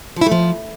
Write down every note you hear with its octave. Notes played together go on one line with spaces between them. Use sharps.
F3
E4
A3
F3